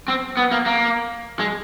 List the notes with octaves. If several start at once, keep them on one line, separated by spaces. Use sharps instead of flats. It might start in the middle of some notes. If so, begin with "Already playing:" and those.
C4
B3
A#3
A#3
G#3